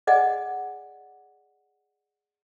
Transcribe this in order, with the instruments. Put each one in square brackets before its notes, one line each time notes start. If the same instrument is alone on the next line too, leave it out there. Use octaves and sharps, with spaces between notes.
[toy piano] G#4 D5 D#5 F#5 G#5